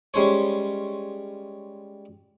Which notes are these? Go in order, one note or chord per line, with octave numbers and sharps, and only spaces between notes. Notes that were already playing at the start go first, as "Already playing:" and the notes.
G3 G#3 C#4 C5 C#5